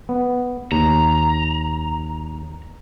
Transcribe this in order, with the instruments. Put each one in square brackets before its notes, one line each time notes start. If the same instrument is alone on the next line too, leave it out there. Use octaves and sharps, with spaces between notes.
[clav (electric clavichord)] B3
[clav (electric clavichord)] D#2 [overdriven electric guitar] A#5